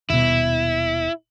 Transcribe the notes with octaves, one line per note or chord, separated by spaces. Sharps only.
D#1 B2 E4